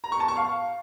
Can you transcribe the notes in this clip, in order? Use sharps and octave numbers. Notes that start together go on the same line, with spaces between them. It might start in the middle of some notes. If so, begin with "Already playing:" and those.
A#5
C#6
A5
C#6
F5